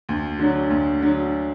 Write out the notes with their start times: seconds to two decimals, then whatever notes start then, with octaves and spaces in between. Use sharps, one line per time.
0.09 D2
0.39 D3 F#3
0.70 D2
1.01 D3 F#3